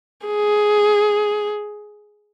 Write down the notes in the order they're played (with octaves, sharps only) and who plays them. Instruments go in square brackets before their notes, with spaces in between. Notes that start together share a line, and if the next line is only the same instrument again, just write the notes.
[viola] G#4